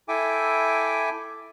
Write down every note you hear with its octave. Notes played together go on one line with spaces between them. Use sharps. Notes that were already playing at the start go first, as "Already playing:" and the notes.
E4 A4 E5 G5 G#5 D6